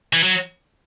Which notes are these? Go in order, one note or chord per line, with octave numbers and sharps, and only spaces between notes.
E3
F#3